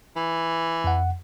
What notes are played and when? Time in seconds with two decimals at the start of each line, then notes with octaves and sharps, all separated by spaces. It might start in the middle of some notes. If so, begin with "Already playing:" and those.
0.16 E3
0.84 F2 F#5